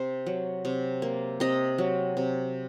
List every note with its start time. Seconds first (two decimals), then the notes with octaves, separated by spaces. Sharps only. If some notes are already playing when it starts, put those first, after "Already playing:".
Already playing: C3 C5
0.26 F#3
0.65 C3
1.02 A#3
1.40 C3 D#5
1.78 F#3
2.17 C3